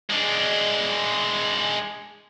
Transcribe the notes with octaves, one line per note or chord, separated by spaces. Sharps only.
G#3 D4